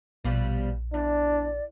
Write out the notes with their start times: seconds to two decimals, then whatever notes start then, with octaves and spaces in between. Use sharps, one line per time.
0.24 A#1 B2 F3 G3
0.94 E2 D4 D5